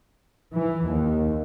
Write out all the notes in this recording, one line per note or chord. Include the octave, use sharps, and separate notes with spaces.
E3
D#2